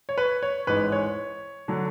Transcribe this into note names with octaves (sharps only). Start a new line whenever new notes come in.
C#5
B4
C#5
A1 G#2 G#3 B4
C#5
D3 F#3